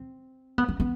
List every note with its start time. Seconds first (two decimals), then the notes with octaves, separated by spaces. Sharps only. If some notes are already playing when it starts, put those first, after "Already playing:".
Already playing: C4
0.58 B3
0.68 B3
0.80 B3